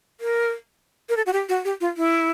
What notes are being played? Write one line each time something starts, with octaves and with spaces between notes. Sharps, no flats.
A#4
A#4
A4
F#4
G4
F#4
G4
F4
E4